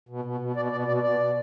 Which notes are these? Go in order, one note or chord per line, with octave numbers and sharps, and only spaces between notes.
B2
B2
B2
B2 D5
B2 D5
B2 D5
B2 D5
B2